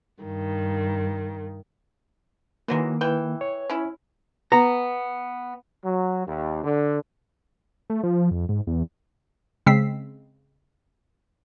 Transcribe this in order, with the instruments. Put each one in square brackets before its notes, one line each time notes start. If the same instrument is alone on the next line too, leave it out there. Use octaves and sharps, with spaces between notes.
[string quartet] G2 D#3
[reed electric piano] D#3 A#3 [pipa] E3 F#3 G#3
[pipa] E3 G5
[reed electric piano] C#5
[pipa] C#4 E4
[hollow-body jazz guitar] B3 A#5
[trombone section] F#3
D#2
D3
[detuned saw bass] A3
F3
F2
G#2
E2
[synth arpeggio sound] C#3 G#3 C4 E6 B6 C7